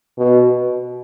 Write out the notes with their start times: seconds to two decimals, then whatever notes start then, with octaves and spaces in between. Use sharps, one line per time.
0.18 B2